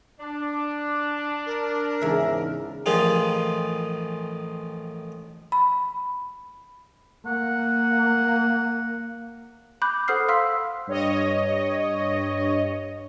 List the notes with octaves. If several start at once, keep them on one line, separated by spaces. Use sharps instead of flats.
D4 D6
A#4
E2 G#2 C#3 E5
A1 D#3 F3 F4 G#4
B5
A#3 F#5
B5 D6 F#6 G6
A4 C5 F#5 D#6 F6 C7
F5 C6 E6 F6 B6
G2 C#5 D#5